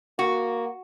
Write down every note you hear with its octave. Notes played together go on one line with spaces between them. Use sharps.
A#3 F#4